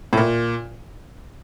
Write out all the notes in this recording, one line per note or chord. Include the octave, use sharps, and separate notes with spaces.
A2
A#2